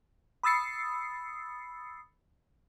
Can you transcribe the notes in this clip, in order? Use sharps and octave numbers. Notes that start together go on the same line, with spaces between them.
B5 D#6 E6 A6 C7 C#7